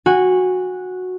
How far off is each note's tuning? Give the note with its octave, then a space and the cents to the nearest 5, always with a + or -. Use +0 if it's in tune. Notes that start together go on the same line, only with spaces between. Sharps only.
F#4 -10 G#5 -25